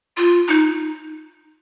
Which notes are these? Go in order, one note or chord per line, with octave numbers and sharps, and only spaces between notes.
F4
D#4